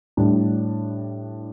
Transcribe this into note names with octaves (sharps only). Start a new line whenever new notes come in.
A2 G3 D4